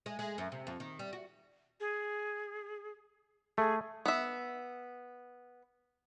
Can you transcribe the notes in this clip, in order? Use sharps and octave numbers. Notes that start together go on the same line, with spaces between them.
G#3
G#3
F#2
C3
F2
D#3
G3
F#4
G#4
A3 G#4
B3 E5